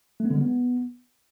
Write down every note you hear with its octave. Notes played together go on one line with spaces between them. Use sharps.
A3
B3
D3
G#3
B3